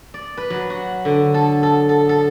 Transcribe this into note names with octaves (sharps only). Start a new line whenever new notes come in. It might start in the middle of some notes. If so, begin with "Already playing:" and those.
D5
B4
F#3
F#4
D3
A4
A4
A4
A4